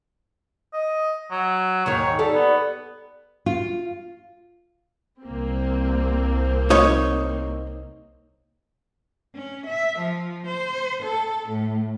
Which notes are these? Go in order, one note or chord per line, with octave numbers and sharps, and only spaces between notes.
D#5
F#3
D#2 G#2 D#3 C#5
G3 A4
B3
F4
C2 A#3 C4
D#4 C#5
C#4
E5
F3
C5
A4
A2